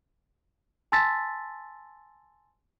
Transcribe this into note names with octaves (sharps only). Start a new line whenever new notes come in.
G#5 A5 C6 E6 A6 B6